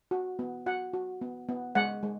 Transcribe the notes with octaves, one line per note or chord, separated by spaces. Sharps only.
F#4
B3
F#4 F#5
F#4
B3
B3
G#3 F#5
G#3